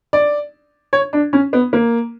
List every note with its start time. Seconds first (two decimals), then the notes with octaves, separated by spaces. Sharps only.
0.13 D5
0.93 C#5
1.13 D4
1.33 C#4
1.53 B3
1.73 A#3